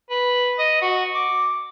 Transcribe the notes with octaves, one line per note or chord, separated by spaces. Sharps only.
B4
D#5
F#4
D6